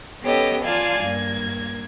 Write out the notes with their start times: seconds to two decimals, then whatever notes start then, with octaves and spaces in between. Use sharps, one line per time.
0.22 B3 C#4 G4 A4 C#5 D#5
0.63 F4 D5 F5 G#5 A5
1.02 G2 A#3 G#6